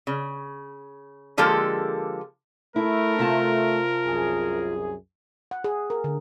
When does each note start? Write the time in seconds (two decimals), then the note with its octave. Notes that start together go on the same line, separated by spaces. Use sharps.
0.07 C#3
1.37 D3 F3 G#3 A#3 G4 A4
2.76 A3 E4 A#4
3.19 C3 F4 A5
4.05 C2 F#2 G#4
5.51 F#5
5.64 G#4
5.90 A#4
6.04 D3